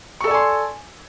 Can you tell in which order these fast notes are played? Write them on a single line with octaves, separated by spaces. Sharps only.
C#6 A4 D5 G#5 C6